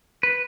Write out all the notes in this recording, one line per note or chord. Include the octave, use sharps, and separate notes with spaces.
B4